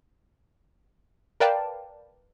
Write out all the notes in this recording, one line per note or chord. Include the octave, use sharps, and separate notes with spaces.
A#4 B4 D5 F5 G5 A5